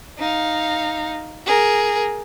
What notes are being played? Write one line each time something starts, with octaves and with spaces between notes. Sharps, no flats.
D#4 F5
G#4 A#4